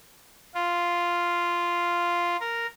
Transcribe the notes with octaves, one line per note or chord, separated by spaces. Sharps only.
F4
A#4